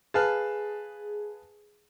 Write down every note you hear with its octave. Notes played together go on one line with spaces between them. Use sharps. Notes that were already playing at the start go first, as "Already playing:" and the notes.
G#4 B4 F5 A5